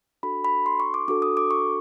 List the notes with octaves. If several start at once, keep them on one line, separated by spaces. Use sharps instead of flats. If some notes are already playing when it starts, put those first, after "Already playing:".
D4 F#4 A4 B5
B5
C6
C#6
D6
D4 F#4 A4 D6
D#6
D6
C#6